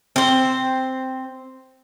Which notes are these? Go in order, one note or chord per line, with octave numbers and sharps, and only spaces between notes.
C4 C5